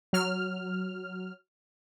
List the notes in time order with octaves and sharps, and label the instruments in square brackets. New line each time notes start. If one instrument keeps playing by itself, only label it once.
[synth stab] F#3 F6